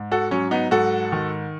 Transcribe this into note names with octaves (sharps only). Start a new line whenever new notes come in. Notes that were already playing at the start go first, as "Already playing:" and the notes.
Already playing: G#2
F#4 A4
F#3 C#4
B3 D#4
G#2 F#4 A4
D#3